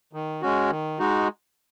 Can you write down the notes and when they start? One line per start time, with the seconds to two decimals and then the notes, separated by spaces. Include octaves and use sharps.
0.13 D#3
0.42 G#3 C#4 F#4
0.70 D#3
0.99 G#3 D#4 F#4